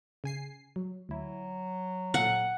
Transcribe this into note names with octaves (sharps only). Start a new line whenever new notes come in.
C#3 G#5 C7
F#3
D2 F#3 E4
A#2 A4 F5 F#5